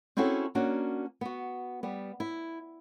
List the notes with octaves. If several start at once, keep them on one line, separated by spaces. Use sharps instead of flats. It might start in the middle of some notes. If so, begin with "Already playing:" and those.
C4 C#4 E4 F#4 G#4 A4
A#3 C#4 D4 F#4
B3 F#4
G3 B3
E4